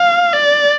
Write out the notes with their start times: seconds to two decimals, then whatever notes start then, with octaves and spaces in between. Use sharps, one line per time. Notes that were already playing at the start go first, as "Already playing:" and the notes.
Already playing: F5
0.33 D5